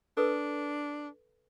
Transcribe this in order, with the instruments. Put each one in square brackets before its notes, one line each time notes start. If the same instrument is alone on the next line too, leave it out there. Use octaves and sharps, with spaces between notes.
[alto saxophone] D4 [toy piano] A4 B4